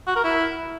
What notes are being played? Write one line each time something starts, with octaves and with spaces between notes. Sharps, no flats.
F#4
A#4
E4